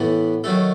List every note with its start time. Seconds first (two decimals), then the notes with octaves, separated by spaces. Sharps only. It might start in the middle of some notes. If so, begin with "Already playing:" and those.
Already playing: A2 E3 B3
0.44 D#3 F#3 A3 A4